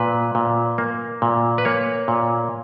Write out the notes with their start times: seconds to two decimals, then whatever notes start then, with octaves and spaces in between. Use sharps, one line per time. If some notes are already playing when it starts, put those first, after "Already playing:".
Already playing: A#2 B4
0.35 A#2
0.78 A#3
1.22 A#2
1.58 B4
1.65 A#3 C#5
2.08 A#2